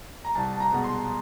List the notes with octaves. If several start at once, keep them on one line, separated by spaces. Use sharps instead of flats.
A#5
C2 A5
A5
A#5
B2 G#3 B3
C6